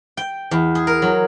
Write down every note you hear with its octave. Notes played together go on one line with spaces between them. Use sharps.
G5
E2
G#4
A#4
F#3